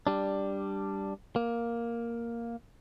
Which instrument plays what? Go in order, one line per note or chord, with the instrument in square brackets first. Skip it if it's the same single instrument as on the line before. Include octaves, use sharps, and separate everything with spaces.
[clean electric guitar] G3 D4
A#3